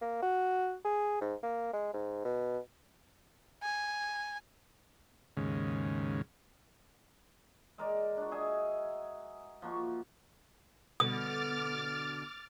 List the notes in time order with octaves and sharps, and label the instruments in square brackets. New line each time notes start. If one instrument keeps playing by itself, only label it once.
[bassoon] A#3
F#4
G#4
G#2
A#3
G#3
G#2
B2
[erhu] G#5
[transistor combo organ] D#2 G#2 C#3
[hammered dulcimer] G#3 A#4 D5
D4 F#4
G#4 D#5 E5 G#5
F3 A#3 F#4 C#6
[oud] B2 D3 [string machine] D6 F6 A6 [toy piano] D#6